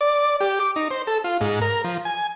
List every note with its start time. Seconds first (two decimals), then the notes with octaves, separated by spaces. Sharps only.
0.01 D5
0.41 G4
0.60 D6
0.76 D#4
0.91 C5
1.07 A4
1.24 F4
1.41 G#2
1.62 A#4
1.84 F3
2.05 G#5